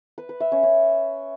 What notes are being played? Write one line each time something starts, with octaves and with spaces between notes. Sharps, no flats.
B4
B4
E5
C#4
C#4